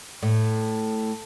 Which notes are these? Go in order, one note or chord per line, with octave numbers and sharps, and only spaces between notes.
A2